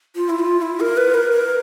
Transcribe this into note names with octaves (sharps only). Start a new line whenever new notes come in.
F4
E4
F4
E4
A#4
B4
A#4
A#4